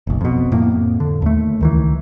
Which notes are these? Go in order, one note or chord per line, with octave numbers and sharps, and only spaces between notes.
F#1 B1
F2 B2
F2 A2 A#3
D3
D#2 A3
C#2 D#3 E3